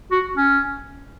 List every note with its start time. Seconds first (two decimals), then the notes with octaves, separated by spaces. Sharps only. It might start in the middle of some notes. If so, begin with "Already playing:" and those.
0.11 F#4
0.37 C#4